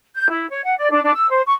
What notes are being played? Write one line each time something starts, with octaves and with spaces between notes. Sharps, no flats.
G6
E4
C#5
F#5
D5
D4
D4
E6
C5
C#6